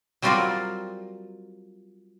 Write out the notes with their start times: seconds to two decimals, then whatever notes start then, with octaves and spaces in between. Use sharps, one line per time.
0.22 F#3 G3 C4 F4 A#4 D5